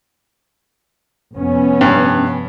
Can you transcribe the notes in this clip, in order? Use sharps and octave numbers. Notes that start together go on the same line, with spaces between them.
F1 B3 C#4
G2